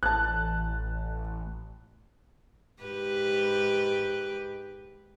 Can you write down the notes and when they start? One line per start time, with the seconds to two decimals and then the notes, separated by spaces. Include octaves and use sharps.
0.03 A1 A5 F#6
2.82 G#2 G4 B4